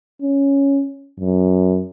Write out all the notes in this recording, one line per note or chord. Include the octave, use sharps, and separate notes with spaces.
C#4
F#2